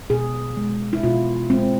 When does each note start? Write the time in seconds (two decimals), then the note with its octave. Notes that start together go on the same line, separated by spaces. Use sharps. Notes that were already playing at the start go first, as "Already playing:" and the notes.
0.10 B2 G#4
0.57 G#3
0.93 E4
1.03 B2 F4
1.50 G#3 C4